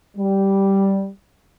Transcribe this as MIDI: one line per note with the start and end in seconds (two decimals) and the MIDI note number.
0.17 1.07 55